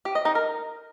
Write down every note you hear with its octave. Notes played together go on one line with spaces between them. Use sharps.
G4
D#5
D#4
A#4